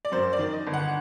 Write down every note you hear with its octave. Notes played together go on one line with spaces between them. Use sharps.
D5
F#2 C5
D5
D#3
D#5
G1
F#5